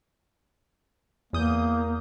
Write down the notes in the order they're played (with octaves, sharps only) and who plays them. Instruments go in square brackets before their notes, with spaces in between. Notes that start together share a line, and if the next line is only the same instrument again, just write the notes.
[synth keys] E2 D#6 G6 [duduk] A#3